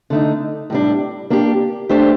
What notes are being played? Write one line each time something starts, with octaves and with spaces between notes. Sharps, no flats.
D3 A3 D#4
A2 G3 D4
A#3 D4 G4
A3 D4 G4 C5